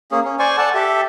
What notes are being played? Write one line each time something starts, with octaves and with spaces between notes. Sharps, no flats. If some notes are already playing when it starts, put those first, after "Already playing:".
A#3 C#4 G#4
C#4
C5 D5 G#5 C#6
A4 D5 F#5 A5
G4 A4 E5